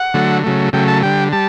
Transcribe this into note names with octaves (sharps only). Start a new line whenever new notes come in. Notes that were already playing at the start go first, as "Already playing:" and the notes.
Already playing: F#5
D3 F#3 A3
C#3 F#3 A3
C#3 F#3 A3 G5
A5
D3 G3 G5
G3 A5